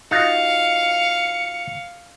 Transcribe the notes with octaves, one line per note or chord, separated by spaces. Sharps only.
D#4 F4 F#4 F5 C#7